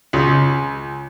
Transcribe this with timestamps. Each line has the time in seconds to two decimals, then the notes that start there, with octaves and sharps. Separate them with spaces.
0.13 C#2